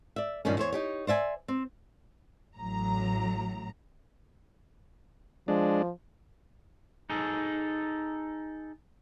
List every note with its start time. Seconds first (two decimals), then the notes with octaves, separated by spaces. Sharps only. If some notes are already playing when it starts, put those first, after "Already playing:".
0.16 D5 E5
0.45 G2 A#2 D#3 G3 C#4
0.58 E2 C5 C#5
0.72 D#4 G4 C#5
1.07 C5 D5 E5 G#5
1.48 C4
2.57 A1 A2 F#3 A#5
5.48 F3 G#3 D4
7.10 D#4 G#4 A4